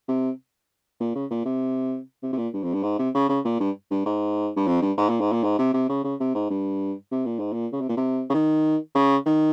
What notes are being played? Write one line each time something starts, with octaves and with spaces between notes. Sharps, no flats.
C3
A#2
C#3
A#2
C3
C3
C3
A#2
G2
F2
G2
G#2
C3
C#3
C#3
A#2
G2
G2
G#2
G2
F2
G2
G#2
A#2
G#2
A#2
G#2
C3
C3
C#3
C#3
C3
G#2
G2
C3
A#2
G#2
A#2
C#3
C3
A#2
C3
C#3
D#3
C#3
D#3